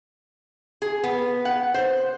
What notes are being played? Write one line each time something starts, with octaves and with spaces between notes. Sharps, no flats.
G#4
B3
F#5
C5